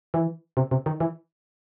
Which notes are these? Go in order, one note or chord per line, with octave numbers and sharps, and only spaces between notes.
E3
C3
C3
D#3
E3